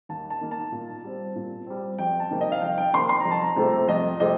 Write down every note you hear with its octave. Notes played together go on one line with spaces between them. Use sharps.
D#2 A5
A5
D#3 A#3
A5
A#2
G3 C4
A#2
G3 C4
F2 G5
A5
C3 D#3 A#3
D#5
F5
F2 G5
G5
C3 D#3 A#3 C6
C6
A#5
F2
A5
A#5
C3 F3 A3 C4
F2 D#5
C3 F3 A3 C4 D#5